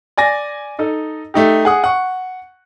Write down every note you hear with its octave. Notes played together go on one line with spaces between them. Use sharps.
D5 G#5 A#6
D#4 A4 D#5
A3 D#4 G4
G#4 F#5 D#6
F#5 C#6